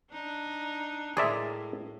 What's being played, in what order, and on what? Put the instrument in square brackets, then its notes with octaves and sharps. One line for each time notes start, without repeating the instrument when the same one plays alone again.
[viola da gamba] D4 D#4
[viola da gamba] A2 [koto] G#3 A#4 [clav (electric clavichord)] G#4 D5 E5